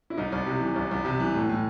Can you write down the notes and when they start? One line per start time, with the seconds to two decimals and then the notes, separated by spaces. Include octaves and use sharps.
0.10 E4
0.18 C2 D#4
0.32 C2
0.46 C3
0.61 E3
0.76 C2
0.91 C2
1.05 C3
1.20 E3
1.35 A2
1.49 A2